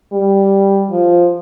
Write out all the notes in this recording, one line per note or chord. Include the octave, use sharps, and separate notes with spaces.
G3
F3